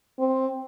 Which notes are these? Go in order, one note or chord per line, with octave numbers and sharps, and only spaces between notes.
C4